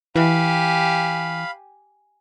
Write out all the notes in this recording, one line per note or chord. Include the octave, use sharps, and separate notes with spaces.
E3 G4 F5 G#5 B5